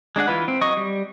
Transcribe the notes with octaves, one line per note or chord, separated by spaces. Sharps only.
G#3 D4 G#4 F#5
E3 F4 B4
C4
F#3 D#5 C#6
G3